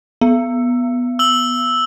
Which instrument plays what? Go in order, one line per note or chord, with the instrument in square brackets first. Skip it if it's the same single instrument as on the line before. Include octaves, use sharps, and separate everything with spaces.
[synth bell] B3
[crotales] E6 F#7